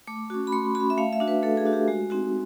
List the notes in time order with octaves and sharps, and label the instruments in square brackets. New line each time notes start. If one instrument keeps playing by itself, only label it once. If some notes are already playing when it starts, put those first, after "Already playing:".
[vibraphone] A3 D6
C#4 F#4
B5
A3 C6
C#4 F#4 B5
E5
A3 F5
E5
D4 F#4
B4
A3 A4
G#4
D4 F#4
G4
G#3 F#4
C4 D#4 F#4